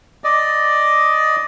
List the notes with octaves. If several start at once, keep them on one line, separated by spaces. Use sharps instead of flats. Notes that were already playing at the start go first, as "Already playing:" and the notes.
D5 D#5